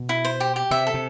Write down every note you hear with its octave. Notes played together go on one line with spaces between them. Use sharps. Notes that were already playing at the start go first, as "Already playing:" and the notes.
Already playing: B2
E4
C5
G4
G4
C3 E5
A4
C3